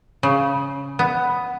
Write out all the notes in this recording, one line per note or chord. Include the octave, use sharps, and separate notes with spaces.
C#3
B3